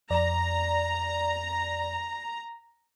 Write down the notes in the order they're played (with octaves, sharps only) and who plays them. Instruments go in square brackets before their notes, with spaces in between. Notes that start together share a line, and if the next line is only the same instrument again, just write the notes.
[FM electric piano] F2 D5 [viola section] A#5